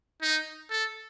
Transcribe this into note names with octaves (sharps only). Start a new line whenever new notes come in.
D#4
A4